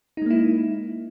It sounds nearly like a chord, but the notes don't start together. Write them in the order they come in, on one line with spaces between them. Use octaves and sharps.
D#4 G#3 A#3 E4